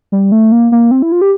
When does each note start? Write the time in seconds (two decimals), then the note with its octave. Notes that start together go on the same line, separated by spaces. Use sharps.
0.12 G3
0.32 A3
0.52 A#3
0.72 A#3
0.91 C4
1.02 E4
1.12 F4
1.21 G4